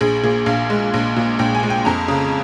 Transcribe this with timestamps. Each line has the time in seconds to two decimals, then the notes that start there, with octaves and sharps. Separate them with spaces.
0.01 A#1 G#4
0.23 A#2 G#4
0.46 A#1 F5
0.70 G#3
0.94 A#1
1.16 A#2
1.39 A#1 G5
1.55 G#5
1.63 G#3
1.70 G5
1.85 F2 A#5
2.08 C#3